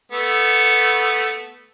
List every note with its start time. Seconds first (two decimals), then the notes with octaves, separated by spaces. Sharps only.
0.12 A3 B3